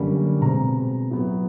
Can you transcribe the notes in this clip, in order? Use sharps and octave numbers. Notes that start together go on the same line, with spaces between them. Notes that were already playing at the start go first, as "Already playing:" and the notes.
Already playing: F#2 D3 G3 A#3 C#4
B2 G#3 C4 A#5
A2 F#3 B3